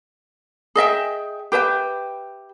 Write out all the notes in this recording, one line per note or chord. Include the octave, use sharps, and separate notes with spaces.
G#4 D#5 E5 G5
G4 B4 E5 G5